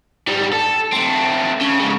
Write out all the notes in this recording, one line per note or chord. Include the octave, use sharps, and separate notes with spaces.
G#2 G3
A4
A3 C4
C#3
G#2 C#3